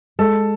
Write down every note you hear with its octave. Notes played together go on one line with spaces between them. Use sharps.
G#3 A4